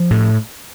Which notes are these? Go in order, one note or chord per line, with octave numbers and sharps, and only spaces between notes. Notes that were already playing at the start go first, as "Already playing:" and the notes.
Already playing: F3
A2